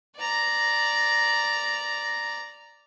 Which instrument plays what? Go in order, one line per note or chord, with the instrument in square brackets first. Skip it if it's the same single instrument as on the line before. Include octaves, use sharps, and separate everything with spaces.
[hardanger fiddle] D5 A#5